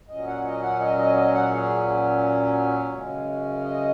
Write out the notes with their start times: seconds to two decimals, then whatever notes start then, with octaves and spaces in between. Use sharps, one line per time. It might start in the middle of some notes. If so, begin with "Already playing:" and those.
0.09 A#2 F#3 C#4 D#5
0.27 F#5
0.45 D#5
0.62 F#5
0.79 D#5
0.97 D#5
1.15 D#5
1.33 F#5
1.51 G#4
2.93 F#2 C#3 G#3 C#4
3.64 D#5